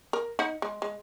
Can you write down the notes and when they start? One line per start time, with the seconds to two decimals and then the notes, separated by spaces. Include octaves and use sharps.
0.13 A#4
0.39 D#4 F#5
0.62 G#3
0.82 G#3